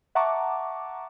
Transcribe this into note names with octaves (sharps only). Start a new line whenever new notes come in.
E5 F#5 A5 A#5 C#6 D6